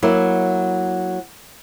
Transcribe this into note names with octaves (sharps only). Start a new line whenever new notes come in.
F#3 A#3 E4